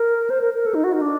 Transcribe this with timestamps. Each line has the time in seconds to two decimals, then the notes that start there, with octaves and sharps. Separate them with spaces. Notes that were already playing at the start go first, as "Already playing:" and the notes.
Already playing: A#4
0.30 C5
0.41 A#4
0.54 A#4
0.66 A4
0.75 D#4
0.84 F#4
0.93 D#4
1.01 D4